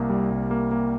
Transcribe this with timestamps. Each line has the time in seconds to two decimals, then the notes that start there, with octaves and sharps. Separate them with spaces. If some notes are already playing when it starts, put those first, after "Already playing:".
Already playing: C2 A#3
0.10 G3
0.30 C2
0.51 A#3
0.71 A#3